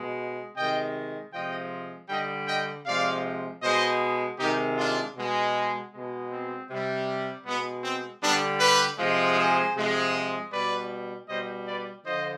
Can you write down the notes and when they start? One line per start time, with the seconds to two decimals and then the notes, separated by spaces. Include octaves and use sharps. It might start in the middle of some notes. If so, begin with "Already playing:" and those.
Already playing: B2 G#3
0.56 C3 D#3 G#3 D#5 G5
1.33 C3 F3 G#3 D#5 G5
2.09 D3 G3 D#5 G5
2.48 D#5 G5
2.86 C3 F3 G#3 D5 F5
3.63 B2 G#3 C5 D#5
4.39 C3 D#3 G#3 D#4 G4
4.77 D4 F4
5.16 B2 G#3
5.93 B2 G#3
6.30 C4
6.69 C3 G3
7.46 B2 G#3 B3
7.84 C4
8.22 D3 G3 B3 D4
8.61 G4 B4
8.99 C3 F3 G#3
9.37 G#4 C5
9.76 C3 F3 G#3
10.52 B2 G3 B4 D5
11.29 B2 G3 C5 D#5
11.67 B4 D5
12.05 D3 F3 C5 D#5